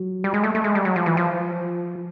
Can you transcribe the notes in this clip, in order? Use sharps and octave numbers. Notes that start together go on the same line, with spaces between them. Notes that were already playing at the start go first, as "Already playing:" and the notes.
Already playing: F#3
G3
G#3
A3
A3
G#3
G3
F#3
F3
E3
F3